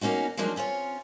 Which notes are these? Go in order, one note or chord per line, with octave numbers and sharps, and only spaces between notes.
B2 A#3 C#4 D#4 F#4
F3 F#3 G#3 A#3 D4 D#4
C4 C#4 F4 C#5